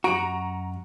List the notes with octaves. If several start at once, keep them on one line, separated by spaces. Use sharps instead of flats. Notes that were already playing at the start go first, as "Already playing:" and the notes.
F#2 F#4 A#5 D7